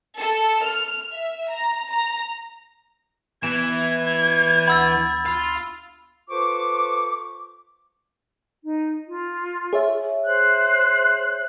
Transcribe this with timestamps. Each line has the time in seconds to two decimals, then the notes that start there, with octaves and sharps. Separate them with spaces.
0.18 A4
0.64 F6
1.12 E5
1.51 A#5
1.90 A#5
3.43 E3 B3 G#6 E7
4.67 D2 F#5 B5 E6 A6
5.26 F5 B5 C6
6.30 F4 A4 B4 C5 C#6 D6
8.63 D#4
9.07 F4
9.73 G#4 C#5 E5
10.24 C5 F#6